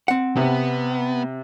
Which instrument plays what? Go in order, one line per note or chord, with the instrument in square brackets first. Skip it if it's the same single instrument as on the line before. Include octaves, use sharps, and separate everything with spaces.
[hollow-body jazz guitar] C4 F#5
[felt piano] C3 [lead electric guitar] B3